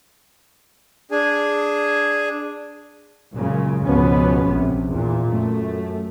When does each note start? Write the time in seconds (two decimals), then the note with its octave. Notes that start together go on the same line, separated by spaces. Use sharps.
1.11 D4 G#4 G#5
3.34 F#2 A#2 C#3 G#3
3.85 C#2 G#2 B2 F3 B3 C#4
4.50 A#1 C3
4.91 E2 A#2
5.30 F#2 A3